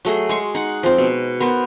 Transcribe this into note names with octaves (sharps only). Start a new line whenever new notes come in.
F#3 A3 G#4
G#3 C6 C#6
D#4 F#5
F3 C4
B2
B3 A#4 C5